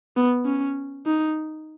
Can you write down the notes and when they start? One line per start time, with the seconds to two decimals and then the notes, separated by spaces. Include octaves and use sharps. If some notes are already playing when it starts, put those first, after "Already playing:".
0.17 B3
0.46 C#4
1.06 D#4